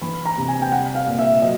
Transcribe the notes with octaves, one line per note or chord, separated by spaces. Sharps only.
E3 B5
A#5
C3
G#5
G5
G3 F#5
F5
A#2
E5
F#3 D#5